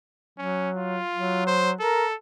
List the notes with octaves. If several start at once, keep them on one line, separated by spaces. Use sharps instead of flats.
F#3 C#4
F4
F#3
C5
A4 A#4